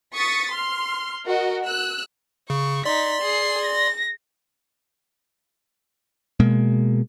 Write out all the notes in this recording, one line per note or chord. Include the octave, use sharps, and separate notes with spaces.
C#6 D#6 A6 B6
C6 F6
F#4 A#4 D#5
E6 F#6
C#3 C#6
D#4 D5 C6 B6
G#4 C7
A#6
B2 G#3 A#3